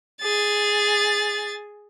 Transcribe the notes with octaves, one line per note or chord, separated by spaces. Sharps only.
G#4 A6